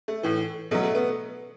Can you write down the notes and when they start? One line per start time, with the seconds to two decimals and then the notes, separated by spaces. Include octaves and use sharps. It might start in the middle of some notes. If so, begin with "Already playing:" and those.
0.08 A3
0.23 A2 E3
0.71 B2 A3
0.75 F#3
0.83 A3
0.95 B3